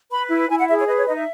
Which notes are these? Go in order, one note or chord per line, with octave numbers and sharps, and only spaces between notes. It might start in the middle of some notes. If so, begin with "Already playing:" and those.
B4 B5
E4
E4 G#5
F#5
G#4 E5
C#5
B4 D#5
C#5
D#4 D#5
E5